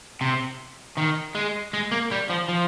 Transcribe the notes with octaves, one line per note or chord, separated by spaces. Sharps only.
C3
D#3
G#3
G#3
A#3
G3
F3
F3